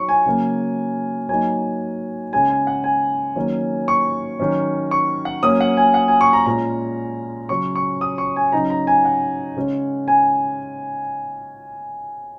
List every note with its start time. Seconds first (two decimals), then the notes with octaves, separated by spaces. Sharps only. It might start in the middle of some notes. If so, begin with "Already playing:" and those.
Already playing: F#3 D#4 C#6
0.09 G#5
0.26 C#3 F#3 A#3
1.29 F#3 A#3 D#4 G#5
2.33 C#3 G#3 C#4 G#5
2.50 G#5
2.67 F#5
2.84 G#5
3.36 D#3 F#3 A#3 C#4
3.88 C#6
4.40 D#3 F#3 C#4
4.91 C#6
5.25 F#5
5.43 F#3 A#3 C#4 D#6
5.61 F#5
5.77 G#5
5.94 F#5
6.08 G#5
6.21 C#6
6.33 A#5
6.46 A#2 G#3 C#4 A#5
7.49 C#3 F#3 C#4 C#6
7.75 C#6
8.01 D#6
8.18 C#6
8.36 G#5
8.52 C#3 F#3 D#4 A#5
8.70 A#5
8.87 G#5
9.05 F#5
9.56 C#3 G#3 C#4
10.08 G#5